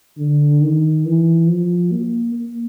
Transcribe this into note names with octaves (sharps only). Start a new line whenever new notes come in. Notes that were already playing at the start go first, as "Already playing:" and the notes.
D3
D#3
E3
F3
A#3
A#3